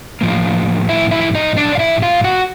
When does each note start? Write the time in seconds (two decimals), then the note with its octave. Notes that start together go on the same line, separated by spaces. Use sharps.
0.21 A2 F3 A#3
0.89 E4 E5
1.11 E4 E5
1.34 D#4 D#5
1.57 D4 D5
1.75 F5
1.79 E4 E5
2.02 F4 F5
2.24 F#4 F#5